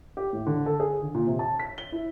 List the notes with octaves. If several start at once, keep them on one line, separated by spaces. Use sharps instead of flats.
G4
A2
D3
A4
G#4
D3
A#2
C3
A5
B6
G7
E4